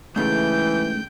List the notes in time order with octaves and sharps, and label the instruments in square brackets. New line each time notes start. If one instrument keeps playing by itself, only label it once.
[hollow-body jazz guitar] G#2 C#3 A3 [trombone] E3 [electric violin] G5 G6